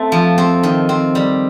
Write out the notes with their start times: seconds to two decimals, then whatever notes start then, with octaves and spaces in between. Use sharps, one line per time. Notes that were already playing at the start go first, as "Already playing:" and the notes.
Already playing: A3 C4
0.12 F3
0.38 C4
0.63 D#3
0.89 C4
1.15 G3